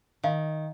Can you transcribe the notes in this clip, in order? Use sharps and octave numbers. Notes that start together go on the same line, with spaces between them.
D#3 F5